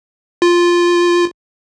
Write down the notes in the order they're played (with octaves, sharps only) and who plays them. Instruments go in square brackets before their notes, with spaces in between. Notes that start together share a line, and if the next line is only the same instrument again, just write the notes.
[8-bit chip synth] F4